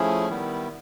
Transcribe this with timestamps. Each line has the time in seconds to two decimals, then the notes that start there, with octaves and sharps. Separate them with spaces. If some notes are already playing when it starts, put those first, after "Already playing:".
Already playing: F3 A3 C#4 E4 G#4
0.29 D#3 G3 B3 E4